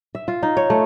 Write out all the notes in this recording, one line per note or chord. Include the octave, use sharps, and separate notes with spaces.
E5
F4
D#4
C#5
A3